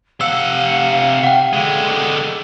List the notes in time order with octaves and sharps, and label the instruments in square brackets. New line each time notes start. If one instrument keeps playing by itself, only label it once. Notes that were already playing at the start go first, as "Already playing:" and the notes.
[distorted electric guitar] C3 F#5 [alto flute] F5 [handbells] E6
[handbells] F#5 G5
[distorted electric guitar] D3 G#3